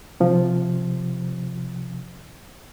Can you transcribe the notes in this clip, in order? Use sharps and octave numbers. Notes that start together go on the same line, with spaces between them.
C3 F3